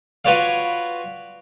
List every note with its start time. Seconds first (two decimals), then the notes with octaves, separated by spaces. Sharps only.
0.25 F4 F#4 B4 C#5 D5 F5